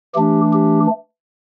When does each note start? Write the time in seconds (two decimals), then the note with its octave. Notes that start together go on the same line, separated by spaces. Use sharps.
0.14 E3 A3 D4 G4
0.53 G4